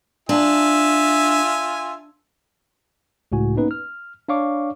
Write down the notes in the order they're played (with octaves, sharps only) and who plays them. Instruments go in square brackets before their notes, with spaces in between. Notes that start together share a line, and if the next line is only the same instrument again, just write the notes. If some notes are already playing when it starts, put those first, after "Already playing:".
[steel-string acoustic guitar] D4 [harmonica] F4 E5 G#5
[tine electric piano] C#2 A2 F#4 G#5
A#3 B3 C#4 D#4 B4
F6
D4 C#5 D5 F5 C#6 D6